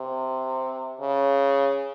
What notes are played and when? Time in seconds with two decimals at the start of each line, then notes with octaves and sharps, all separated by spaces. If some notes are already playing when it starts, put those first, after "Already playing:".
Already playing: C3
1.00 C#3